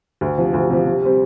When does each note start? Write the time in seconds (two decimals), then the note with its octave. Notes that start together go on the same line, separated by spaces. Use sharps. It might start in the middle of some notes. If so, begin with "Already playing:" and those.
0.21 D2
0.38 C3 F3
0.53 D2
0.70 C3 F3
0.86 C3
1.02 G3 C4